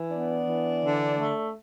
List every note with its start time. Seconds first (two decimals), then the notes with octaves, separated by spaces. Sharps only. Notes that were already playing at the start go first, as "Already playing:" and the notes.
Already playing: E3
0.10 B3 D4
0.46 E3
0.82 D3
1.19 A3